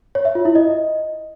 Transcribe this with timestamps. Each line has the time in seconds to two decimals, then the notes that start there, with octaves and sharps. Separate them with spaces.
0.15 C#5
0.25 E5
0.35 F4
0.45 E4
0.55 D#5